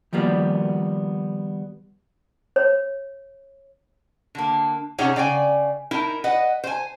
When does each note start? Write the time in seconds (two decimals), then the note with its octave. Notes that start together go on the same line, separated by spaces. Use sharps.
0.13 D#3 F3 G3 A#3 B3
2.56 C#5
4.35 D3 A#3
4.98 C3 C#4 D#4 G#4 C#5 F#5
5.16 C#3 D5 G5 G#5
5.91 D#4 E4 A#4
6.24 B4 D#5 F#5
6.64 C5 G#5